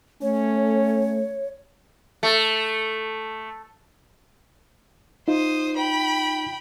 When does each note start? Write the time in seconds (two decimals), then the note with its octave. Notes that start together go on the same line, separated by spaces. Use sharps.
0.22 A3 C#4 C#5
2.23 A3
5.28 D#4 F4 C5 D#6
5.76 G5 B5